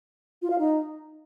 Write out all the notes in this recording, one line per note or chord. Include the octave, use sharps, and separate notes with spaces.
F4
F5
D#4